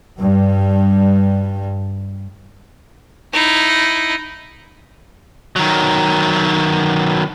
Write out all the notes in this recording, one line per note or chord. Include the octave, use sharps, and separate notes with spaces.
G2 G3
D#4 E4
D#3 F#3